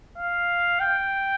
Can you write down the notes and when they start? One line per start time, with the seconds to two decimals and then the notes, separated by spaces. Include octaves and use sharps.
0.18 F5
0.80 G5